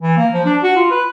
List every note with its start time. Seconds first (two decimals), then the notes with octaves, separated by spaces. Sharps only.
0.02 E3
0.17 A#3
0.34 F3
0.46 D4
0.63 F#4
0.76 F4
0.91 B4